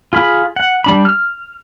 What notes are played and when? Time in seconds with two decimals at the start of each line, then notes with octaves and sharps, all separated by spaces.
0.13 F4 G#4 B5
0.56 F#5
0.84 G3 D4 B5
1.05 F6